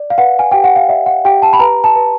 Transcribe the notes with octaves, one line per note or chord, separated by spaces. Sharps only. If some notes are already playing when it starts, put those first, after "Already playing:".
Already playing: D5
F5
B4 F#5
G#5
G4 G5
F#5
F5
D5 E5
F#5
G4 G5
A5
B5
B4 A#5
A5
B4